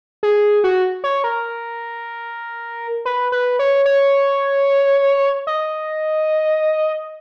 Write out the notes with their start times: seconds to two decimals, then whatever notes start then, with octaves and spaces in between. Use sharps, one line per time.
0.23 G#4
0.64 F#4
1.04 C#5
1.24 A#4
3.05 B4
3.32 B4
3.59 C#5
3.86 C#5
5.47 D#5